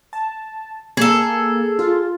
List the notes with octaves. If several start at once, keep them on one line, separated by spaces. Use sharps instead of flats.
A5
A#3 G#4 A4
F4